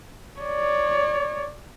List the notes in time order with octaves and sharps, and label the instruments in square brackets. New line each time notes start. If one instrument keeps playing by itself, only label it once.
[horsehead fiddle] C#5 D5